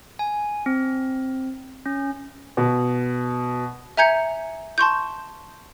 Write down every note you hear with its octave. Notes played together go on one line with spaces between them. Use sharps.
G#5
C4
C#4
B2
E5 G#5 A#5 G6 G#6 C#7
A5 C6 C#6 G6